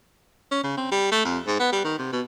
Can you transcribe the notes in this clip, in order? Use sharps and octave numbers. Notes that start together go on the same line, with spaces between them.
C#4
C#3
C4
G3
A3
F2
G#2
B3
G3
D#3
C3
B2